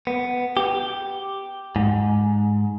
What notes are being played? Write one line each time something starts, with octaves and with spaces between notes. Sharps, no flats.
B3
G4
G#2